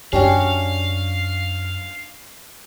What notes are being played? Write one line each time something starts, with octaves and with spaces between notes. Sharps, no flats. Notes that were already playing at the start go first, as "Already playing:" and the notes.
F#2 C#4 D4 F#4 G4 F5 G5